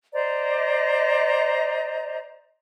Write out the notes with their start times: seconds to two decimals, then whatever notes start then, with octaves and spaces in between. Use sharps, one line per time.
0.14 C5 D5 D#5 A#5